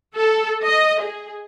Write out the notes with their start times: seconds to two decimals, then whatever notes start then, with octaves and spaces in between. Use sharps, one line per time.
0.16 A4
0.66 D#5
1.02 G#4